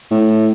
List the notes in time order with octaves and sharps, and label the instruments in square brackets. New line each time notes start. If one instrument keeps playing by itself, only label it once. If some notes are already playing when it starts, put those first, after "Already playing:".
[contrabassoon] A2